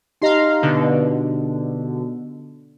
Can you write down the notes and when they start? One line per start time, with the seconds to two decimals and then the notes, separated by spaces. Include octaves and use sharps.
0.22 D#4 G4 D#5 F5 A#5 C6
0.62 B2 D3